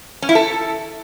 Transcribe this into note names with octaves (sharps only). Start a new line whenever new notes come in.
C#4
E4
A4